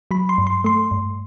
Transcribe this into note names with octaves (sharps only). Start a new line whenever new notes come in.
F#3 B5
C6
G2
C6
A3 C6
G2